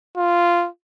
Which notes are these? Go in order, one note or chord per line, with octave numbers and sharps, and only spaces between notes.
F4